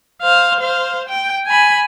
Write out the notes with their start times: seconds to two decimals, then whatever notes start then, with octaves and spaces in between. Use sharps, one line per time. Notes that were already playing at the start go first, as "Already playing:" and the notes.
0.22 C5 F5
0.60 C5 F5
1.08 G5
1.47 G#5 B5